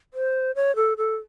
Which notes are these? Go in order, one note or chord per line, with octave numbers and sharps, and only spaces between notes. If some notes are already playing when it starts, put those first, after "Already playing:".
C5
C#5
A4
A4